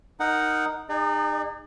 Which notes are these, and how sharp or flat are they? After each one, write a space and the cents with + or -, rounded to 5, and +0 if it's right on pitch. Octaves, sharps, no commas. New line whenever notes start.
D#4 +0 A#4 +0 F#5 +0
D#4 -30 G#4 -40 D5 +35